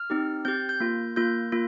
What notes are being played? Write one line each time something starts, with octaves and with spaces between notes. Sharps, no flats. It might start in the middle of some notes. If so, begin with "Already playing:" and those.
Already playing: F6
C4 D#4 G4
C4 G4 G6
G6
A#3 F4
A#3 F4 G6
A#3 F4